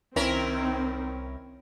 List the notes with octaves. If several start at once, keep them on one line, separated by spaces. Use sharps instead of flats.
C2 D#3 C4 C#4 E4 A#4